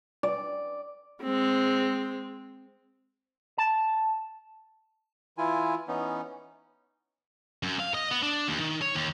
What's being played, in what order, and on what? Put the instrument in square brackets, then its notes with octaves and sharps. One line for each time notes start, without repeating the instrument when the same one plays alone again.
[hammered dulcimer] D5
[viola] G#3 C4
[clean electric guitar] A5
[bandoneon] E3 E4 F4 G#5
E3 B3 C#4 D#4
[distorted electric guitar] F#2
F5
D#5
B3
D4
D#2
D#3
C#5
D#2